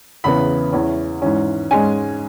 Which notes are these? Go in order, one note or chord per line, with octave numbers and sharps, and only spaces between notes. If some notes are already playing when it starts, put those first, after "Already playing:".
E2 C#3 E3 B3 B5
E2 E3 C#4
G#2 E3 C#4
G#2 G#3 C#4 G#5